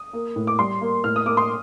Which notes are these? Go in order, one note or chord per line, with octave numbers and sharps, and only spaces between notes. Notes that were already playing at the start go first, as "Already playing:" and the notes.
Already playing: D#6
A#3
A2
D6
G3 C6
A#3
A2 F6
D#6
A#3 D6
C6